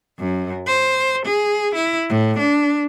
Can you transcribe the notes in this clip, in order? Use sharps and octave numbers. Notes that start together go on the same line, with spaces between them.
F#2
C5
G#4
E4
A2
D4